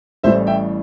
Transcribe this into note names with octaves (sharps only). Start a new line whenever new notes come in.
A1 A2 E3 G3 C5 E5
E5 G5